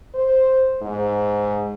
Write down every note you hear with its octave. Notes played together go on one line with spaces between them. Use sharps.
C5
G#2